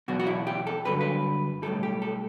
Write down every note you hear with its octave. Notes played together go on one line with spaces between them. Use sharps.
E2 B2 F#3 F#4
F#4
E4
G4
A4
G2 D3 F#3 B4
B4
B1 A2 E3 G3 A4
G4
A4